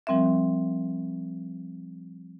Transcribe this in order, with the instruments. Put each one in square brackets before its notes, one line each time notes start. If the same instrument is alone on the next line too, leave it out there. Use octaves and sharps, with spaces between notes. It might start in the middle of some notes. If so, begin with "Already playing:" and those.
[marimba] F3 G3 C4 A#4 E5